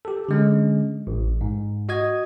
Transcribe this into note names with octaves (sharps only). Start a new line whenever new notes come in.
G4 A4
D3 G#3 C#4
A1
G#2
F#4 D#5 D#6 G#6